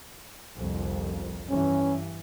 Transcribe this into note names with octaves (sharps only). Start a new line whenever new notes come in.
G1 C2 F2
G2 E3 C#4